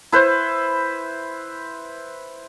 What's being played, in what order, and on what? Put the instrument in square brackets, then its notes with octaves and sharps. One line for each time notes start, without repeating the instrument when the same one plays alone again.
[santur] E4 B4 C5